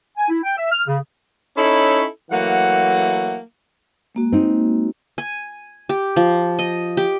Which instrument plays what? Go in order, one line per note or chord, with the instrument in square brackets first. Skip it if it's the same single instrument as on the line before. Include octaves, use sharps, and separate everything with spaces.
[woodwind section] G#5
E4
G5
E5
F6
C#3
[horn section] C#4 D#4 E4 A4 C#5 B5
E3 F#3 A3 A#3 F#5
[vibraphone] G#3 A#3 F#4
[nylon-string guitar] C4 D#4
[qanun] G#5
G4
F3
D#5
G4